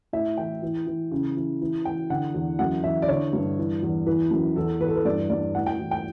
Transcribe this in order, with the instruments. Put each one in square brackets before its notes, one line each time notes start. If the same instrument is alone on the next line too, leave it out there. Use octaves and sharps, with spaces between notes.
[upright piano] A2 E5
E3 G5
E3
E3
C#3
E3
E3
E3 G5
D3 F#5
E2
F#2 F#5
E3 E5
D5
D3 C#5
G2
E3
E2
E3 B4
F#2
E2 A4
E2 B4
A4
B4
G2 D5
G2 D5
A2 F#5
G5
E3
G5